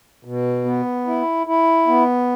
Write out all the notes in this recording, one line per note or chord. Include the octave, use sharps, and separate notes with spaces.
B2
B3
E4
E4
B3